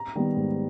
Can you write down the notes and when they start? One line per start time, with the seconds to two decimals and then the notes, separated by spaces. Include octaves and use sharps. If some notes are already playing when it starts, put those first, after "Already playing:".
Already playing: A#5
0.15 D#3 G3 B3
0.37 G#2